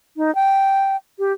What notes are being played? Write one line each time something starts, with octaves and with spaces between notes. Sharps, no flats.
D#4
G5
G4